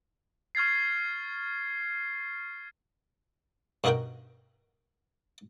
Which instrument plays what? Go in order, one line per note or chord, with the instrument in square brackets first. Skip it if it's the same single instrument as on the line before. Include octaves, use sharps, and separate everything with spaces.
[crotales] C#6 F6 G#6 A6 C7
[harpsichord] G2 B2 D#4 F#4 A#4 G5